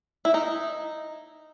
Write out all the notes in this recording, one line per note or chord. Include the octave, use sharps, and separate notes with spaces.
E4
D#4